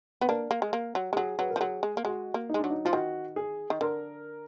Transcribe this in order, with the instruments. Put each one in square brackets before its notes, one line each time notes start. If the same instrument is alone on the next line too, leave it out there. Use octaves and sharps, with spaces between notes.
[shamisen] B3 [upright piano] B4
[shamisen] A#3 D4 [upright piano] A#4
[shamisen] A#3
G#3
A#3
F#3
G#3
[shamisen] F#3 [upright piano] G#4
[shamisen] F#3 [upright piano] B4
[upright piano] A#4
[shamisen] F3
[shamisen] F#3 [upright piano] G#4
[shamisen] G#3
A#3
[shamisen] G#3 [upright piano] F#4
[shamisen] A#3
[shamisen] G#3 [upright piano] D#4
[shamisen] F#3 [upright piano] D4
[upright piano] D#4
[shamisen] F3 [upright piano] F4
[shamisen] D#3 [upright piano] F#4
[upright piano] G#4
[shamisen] D#3
[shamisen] D3 [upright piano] A#4